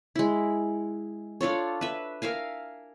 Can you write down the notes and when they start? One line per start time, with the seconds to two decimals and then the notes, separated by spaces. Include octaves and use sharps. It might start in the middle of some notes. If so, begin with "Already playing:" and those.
0.16 G#3 E4
1.41 D4 F4 A4 C#5
1.81 B4 E5
2.22 A#4 E5 F5 G#5